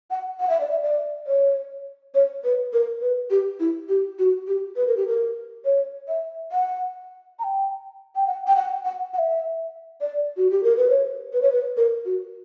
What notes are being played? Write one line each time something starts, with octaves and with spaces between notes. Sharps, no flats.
F#5
F#5
E5
D5
E5
D5
C#5
C#5
B4
A#4
B4
G4
E4
G4
F#4
G4
B4
A#4
G4
A#4
C#5
E5
F#5
A#5
G5
G5
F#5
G5
F#5
F#5
F#5
E5
D5
F#4
G4
A#4
B4
C#5
B4
C#5
B4
A#4
F#4